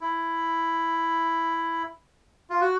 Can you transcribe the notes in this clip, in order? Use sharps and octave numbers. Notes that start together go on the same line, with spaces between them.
E4
F4
F#4